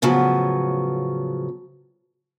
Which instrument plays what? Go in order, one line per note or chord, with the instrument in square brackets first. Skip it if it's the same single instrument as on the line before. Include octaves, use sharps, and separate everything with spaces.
[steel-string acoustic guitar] A2 C#3 F3 F#3 B3